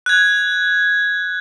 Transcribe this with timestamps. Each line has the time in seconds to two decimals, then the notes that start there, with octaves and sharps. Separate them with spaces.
0.06 F#6 G#6